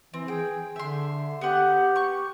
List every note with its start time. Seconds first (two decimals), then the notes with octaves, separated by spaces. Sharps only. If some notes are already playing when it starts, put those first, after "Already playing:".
0.14 E3 C4
0.28 G#4 G5
0.76 D3 E5 C6
1.41 B3 G4 F#5
1.96 C#6